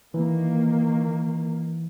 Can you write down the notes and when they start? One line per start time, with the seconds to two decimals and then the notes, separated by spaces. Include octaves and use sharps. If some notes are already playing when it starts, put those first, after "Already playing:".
0.14 D#3 E3 A#3